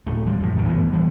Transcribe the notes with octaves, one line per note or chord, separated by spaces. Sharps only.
D1 A3
F3 G3 G#3
F#2 A2
G1 E2 G#2 B2
D1 E3 A3 B3
F1 E3 G3 B3